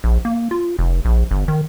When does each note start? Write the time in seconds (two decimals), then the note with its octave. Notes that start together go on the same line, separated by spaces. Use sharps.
0.04 A#1
0.25 A#3
0.51 F4
0.79 F1
1.05 A#1
1.31 G1
1.48 D#3